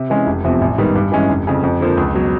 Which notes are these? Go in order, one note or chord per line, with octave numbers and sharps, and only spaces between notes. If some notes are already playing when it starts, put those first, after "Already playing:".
Already playing: C3
E3 G#3 C#4
F1
E2 C3 F3
A1
G#2 D#3 G3 B3
G2
E3 G#3 C#4
F1
F2 C#3
F2
D3 F3 A#3
C#2
B2 F#3